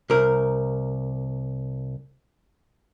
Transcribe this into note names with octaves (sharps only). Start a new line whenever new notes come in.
C2 A#4